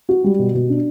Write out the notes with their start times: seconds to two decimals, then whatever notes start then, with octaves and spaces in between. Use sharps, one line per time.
0.09 F#4
0.24 G3
0.39 B2
0.54 B2
0.69 D4